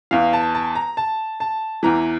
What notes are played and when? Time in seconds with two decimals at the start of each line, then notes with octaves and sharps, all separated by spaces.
0.11 E2 E3 F5
0.33 A5
0.55 A5
0.75 A#5
0.97 A5
1.40 A5
1.83 E2 E3 A#5